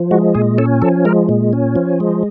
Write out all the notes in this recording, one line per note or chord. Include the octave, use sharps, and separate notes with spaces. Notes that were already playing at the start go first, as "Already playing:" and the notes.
Already playing: F3
G#3 F#4
A#2 G#4
C#4 A4
F3 A4
G#3 A#4
A#2
C#4
F3
G#3